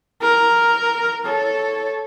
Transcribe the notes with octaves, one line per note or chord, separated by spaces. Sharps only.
A#4
A4 C#5